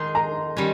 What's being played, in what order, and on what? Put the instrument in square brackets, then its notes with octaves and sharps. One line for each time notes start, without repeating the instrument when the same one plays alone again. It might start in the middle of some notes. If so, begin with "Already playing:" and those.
Already playing: [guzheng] D#3 G#3 D#4 G#4 [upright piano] C6
[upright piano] A#5
[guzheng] D#3 G3 C#4